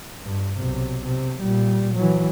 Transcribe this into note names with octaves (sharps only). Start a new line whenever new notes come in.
G2
B1 C3
C3
A#2 G3
E3 F#3